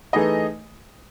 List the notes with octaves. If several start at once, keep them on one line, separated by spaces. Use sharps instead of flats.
E3 A3 D#4 G#4 D#5